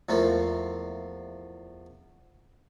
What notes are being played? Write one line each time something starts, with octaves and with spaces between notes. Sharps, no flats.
E2 F3 A3 A#3